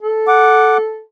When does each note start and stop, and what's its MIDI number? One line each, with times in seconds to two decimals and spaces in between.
0.02 1.02 69
0.28 0.78 78
0.28 0.78 86